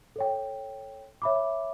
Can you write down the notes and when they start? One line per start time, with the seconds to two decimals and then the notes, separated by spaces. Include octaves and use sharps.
0.16 A4 C#5 G5
1.22 C#5 E5 B5 D6